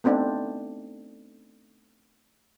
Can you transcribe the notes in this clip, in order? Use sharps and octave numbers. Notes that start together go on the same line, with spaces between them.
A3 B3 C4 D4 D#4